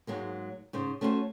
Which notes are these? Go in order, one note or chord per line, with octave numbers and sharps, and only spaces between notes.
G#2 F#3 G#3 A#3
G#2 C#3 C5
A3 C#4 F#4 C5 G5 G#5